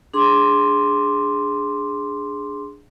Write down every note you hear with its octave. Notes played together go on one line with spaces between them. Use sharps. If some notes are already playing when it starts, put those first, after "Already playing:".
D4 G#4 C6 D6